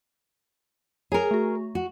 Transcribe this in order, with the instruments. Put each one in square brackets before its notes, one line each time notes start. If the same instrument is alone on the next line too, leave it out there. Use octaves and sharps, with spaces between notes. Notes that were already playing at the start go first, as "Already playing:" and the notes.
[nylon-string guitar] G#4 A#4 [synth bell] C#5 G#5 A#5
[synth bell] A3 F#4
[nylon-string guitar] F#4